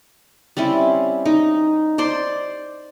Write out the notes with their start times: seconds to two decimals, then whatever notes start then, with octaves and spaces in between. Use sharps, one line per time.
0.57 G3 C4 C#4 E4
1.25 D#4
1.98 C5 D5 C6